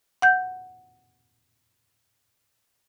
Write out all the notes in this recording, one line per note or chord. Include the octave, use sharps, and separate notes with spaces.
F#5 G6